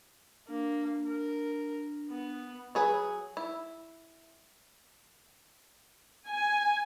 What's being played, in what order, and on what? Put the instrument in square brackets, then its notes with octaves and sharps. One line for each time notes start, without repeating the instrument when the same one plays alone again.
[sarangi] A#3 [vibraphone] D4
[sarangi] A#4
B3
[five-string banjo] F#3 G#4 B4
E4
[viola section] G#5